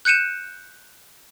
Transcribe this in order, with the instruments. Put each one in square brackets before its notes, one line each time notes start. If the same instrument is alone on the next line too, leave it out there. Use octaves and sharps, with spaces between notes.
[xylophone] F#6 G6 C#7 D#7 E7